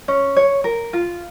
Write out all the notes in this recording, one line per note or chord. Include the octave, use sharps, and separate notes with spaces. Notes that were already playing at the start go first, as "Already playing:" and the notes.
C#4
C#5
A#4
F4